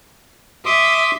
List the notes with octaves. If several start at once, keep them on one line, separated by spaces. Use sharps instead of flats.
E5 C6 D6 D#6